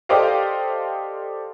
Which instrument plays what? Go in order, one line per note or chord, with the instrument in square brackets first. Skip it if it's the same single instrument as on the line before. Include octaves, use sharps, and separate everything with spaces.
[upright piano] G4 A4 C5 D5 D#5 F5